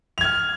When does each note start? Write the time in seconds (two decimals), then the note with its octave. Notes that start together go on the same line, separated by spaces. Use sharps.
0.18 F7
0.21 G#6
0.24 F6